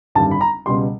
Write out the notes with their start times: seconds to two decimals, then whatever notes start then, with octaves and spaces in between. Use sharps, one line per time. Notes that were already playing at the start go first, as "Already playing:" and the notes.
0.15 G#1 F#2 D3 G3 A5
0.31 B5
0.41 A#5
0.66 C#2 B2 G3 C6